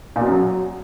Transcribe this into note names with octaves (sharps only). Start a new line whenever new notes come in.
A#2
B2
F#2
F#3